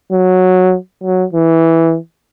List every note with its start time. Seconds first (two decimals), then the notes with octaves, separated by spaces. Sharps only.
0.12 F#3
1.03 F#3
1.33 E3